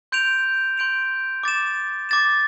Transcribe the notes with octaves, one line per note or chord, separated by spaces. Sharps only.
C6 G6 D7 F7
C6 G6 D7 F7
D6 A6 E7
D6 A6 E7